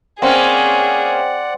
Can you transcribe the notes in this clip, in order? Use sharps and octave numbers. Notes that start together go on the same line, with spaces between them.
A#3 C4 C#4 G#4 D5 F#5